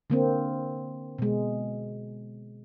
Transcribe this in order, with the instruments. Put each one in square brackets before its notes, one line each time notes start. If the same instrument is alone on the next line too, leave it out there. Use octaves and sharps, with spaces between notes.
[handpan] D3 A#3 C4
B2 G#3